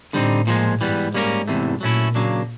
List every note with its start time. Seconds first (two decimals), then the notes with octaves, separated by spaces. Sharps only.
0.13 A2 D3 G3 C4 D#4
0.47 A#2 F3 G#3
0.80 G#2 E3 G3 B3
1.14 G3 A#3 C#4 F#4 A#4
1.48 E2 C3 E3 A3
1.81 A#2 F#3 A3 C#4 E4
2.15 C#3 F#3 A#3 D4